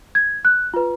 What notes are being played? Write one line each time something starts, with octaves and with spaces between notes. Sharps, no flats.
G#6
F#6
F4 B4